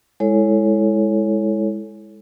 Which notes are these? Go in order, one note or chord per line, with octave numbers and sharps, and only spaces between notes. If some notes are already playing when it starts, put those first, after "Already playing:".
G#3 E4 A4 C#5